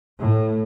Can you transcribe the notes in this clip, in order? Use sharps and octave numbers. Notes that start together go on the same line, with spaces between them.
A2